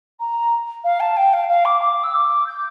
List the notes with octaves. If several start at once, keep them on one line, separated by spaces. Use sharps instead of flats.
A#5
F5
A5
G5
F5
F5
D6
D6
E6
D6
G6